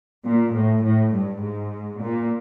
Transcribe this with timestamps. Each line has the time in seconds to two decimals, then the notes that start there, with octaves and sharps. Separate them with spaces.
0.24 A#2
0.54 A2
0.83 A2
1.12 G2
1.41 G#2
2.00 A#2